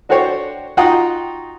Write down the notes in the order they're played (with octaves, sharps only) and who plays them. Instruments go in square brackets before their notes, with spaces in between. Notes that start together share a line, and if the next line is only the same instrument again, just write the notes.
[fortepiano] D4 F#4 A4 C5 C#5 G5
D#4 F4 F#4 F#5 G5 D#6